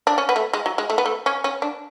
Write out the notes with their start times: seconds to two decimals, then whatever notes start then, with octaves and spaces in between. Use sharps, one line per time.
0.07 D4
0.18 C#4
0.29 B3
0.36 A3
0.53 G#3
0.66 F#3
0.78 G#3
0.90 A3
0.98 B3
1.06 A3
1.26 C#4
1.44 C#4
1.62 D4